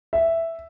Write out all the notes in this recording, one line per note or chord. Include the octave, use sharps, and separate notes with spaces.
E5